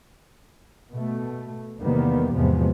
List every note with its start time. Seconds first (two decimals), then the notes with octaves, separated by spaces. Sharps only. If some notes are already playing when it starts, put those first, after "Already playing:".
0.92 B2 A3
1.80 E2 C3 D#3 G3 A#3 B3
2.34 E2 G#2 C3 F3 G#3 B3